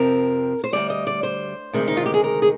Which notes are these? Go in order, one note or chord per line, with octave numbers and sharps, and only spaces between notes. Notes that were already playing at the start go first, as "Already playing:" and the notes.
Already playing: F2 C3 F3 C4 A#4
C5
D2 C3 G3 D5
D#5
D5
C5
D2 C3 D#3 G#3
D#4
F4
G4
G#4
A#4
G#4